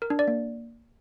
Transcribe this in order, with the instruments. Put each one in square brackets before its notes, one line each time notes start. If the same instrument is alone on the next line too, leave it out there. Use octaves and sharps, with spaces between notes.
[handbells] A#4
D4
D5
A#3